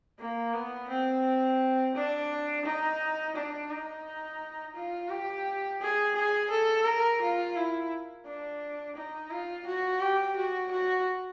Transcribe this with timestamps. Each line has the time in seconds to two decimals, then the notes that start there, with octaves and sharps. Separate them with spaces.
0.19 A#3
0.54 B3
0.89 C4
1.95 D4
2.65 D#4
3.35 D4
3.70 D#4
4.75 F4
5.10 G4
5.81 G#4
6.15 G#4
6.50 A4
6.85 A#4
7.21 F4
7.56 E4
8.25 D4
8.96 D#4
9.30 F4
9.66 F#4
10.00 G4
10.36 F#4
10.71 F#4